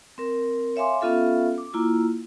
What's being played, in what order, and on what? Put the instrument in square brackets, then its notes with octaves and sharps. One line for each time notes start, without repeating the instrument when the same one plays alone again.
[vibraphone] C4 A#4
C#5 E5 F5 G#5 C6 D6
B3 C#4 F4 A4 E5 F5
D6
A#3 E4 F4